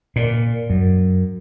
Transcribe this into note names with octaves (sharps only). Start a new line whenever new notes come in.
A#2
F#2